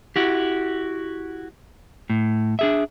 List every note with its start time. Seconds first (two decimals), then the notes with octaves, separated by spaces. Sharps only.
0.16 E4 F#4 G4
2.10 A2
2.59 D4 G#4 E5